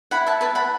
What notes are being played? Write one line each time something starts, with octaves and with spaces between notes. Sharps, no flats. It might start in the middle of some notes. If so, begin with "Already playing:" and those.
E4 F#5 B5
E5 A5
B4 E5 A5
F#5 B5